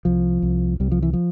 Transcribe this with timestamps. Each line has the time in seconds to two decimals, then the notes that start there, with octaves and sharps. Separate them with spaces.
0.05 C2 F3
0.42 C2
0.80 C2 G3
0.92 F3
1.03 E3
1.13 F3